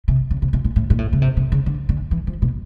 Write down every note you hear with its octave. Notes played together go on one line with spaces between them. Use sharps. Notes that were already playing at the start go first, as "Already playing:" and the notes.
C3
C#3
C3
B2
A#2
A2
A#2
A2
C#3
C3
C3
C#3
D3
D3
E3
F3
B2